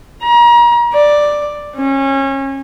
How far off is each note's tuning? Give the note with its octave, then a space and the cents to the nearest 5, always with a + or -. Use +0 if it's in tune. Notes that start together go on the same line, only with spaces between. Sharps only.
A#5 +35
D5 +5
C#4 -25